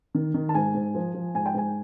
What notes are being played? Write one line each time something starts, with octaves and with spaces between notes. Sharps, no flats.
D#3
D#3
A5
G#2 G#5
G#2
F3
F3
G#2 G#5
G5
G#2 G#5